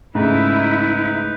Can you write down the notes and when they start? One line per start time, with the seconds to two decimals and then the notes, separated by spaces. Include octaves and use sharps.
0.15 G#2 C#3 A3 D#4 E4 B4